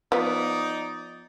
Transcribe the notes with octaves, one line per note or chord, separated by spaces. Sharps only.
F3 B3 D#4 D5